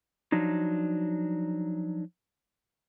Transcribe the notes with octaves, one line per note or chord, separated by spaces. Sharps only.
F3 F#3 D4 D#4